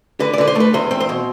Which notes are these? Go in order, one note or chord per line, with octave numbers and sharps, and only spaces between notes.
D3 B4
D5
D3 B4
C5
A3 B4
E2 C5
C4
C5
B2